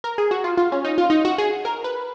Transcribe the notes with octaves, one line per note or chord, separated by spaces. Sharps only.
A#4
G#4
F#4
F4
F4
C#4
D#4
F4
D#4
F#4
G#4
A#4
B4